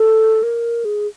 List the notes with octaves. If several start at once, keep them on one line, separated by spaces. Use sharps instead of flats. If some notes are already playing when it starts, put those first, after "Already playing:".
Already playing: A4
A#4
G#4